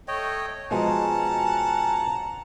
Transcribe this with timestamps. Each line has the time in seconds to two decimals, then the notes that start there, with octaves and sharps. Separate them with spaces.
0.08 A3 C#5 D#5 G5
0.71 B2 F3 G#3 C#4 F#5 A5 A#5